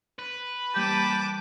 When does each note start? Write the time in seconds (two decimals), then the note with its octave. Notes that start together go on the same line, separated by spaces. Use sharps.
0.19 B4
0.75 E3 G3 A#3 G4 A5 D6